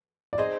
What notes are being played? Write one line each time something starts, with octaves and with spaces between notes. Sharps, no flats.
D5
C4 D#4 G#4 C5 D#5